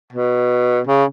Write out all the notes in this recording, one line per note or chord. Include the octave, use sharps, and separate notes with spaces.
B2
C#3